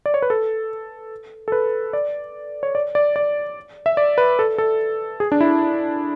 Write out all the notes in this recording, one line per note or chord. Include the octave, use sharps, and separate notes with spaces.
D5
C#5
B4
A4
A4
B4
D5
C#5
D5
D5
D5
E5
D5
B4
A4
A4
G#4
D4
E4